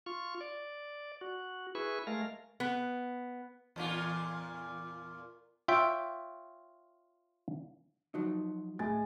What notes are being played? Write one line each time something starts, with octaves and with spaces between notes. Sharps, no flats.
F4 C#6
D5
F#4
E4 G#4 B4 C#6
G#3 A3 A#4 F5
B3
E2 A#2 F4
F4 C#5 E5 G5
F3 F#3 D#4
A2 G#3 G#5 A6